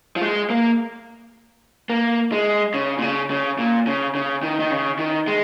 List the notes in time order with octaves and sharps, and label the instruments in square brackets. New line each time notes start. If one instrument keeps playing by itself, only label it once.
[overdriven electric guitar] F3
G#3
A#3
A#3
G#3
C#3
A#2
C#3
C#3
A#2
C#3
C#3
D#3
D#3
C#3
D#3
G#3